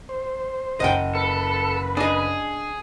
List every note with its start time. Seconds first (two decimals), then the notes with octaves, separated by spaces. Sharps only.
0.09 C5
0.80 F#1 D#5 F#5 G5
1.15 A4 B4
1.97 D4 G#4 D#5